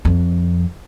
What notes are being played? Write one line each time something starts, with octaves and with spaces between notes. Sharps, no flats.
F2